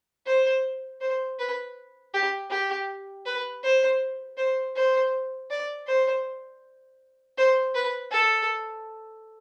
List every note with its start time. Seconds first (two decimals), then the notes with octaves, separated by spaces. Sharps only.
0.26 C5
1.01 C5
1.39 B4
2.14 G4
2.50 G4
3.26 B4
3.63 C5
4.37 C5
4.76 C5
5.50 D5
5.87 C5
7.37 C5
7.74 B4
8.11 A4